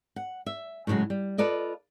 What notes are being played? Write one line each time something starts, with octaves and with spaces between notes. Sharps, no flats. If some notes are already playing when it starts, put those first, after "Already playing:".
F#5
E5
A2 C#3 E3 F#3 G#3
G3
F4 A4 B4 D5 D#5